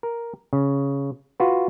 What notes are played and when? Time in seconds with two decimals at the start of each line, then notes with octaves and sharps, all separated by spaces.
0.03 A#4
0.53 C#3
1.40 F4 F#4 B4